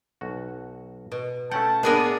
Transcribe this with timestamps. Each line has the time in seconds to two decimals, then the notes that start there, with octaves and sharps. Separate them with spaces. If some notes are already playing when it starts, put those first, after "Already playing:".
0.21 B1 F#4
1.12 B2
1.51 A3 C#4 F#5 G5 A5
1.83 A2 A#3 B3 D4 G#4 A#4 B4